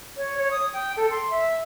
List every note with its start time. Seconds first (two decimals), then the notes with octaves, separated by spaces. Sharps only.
0.17 C#5
0.37 C#5
0.51 D#6
0.73 G5
0.97 A4
1.11 C6
1.30 E5